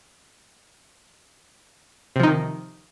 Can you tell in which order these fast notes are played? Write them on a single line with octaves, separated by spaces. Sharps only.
C3 F3 D#4 D#3